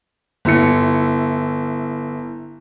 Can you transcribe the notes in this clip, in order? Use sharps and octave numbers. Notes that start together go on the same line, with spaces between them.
G1 E4 C#7